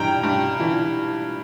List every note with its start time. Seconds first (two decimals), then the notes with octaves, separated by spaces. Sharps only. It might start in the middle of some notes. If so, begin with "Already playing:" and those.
Already playing: G2 E3 G5 A#5
0.23 G2
0.60 E3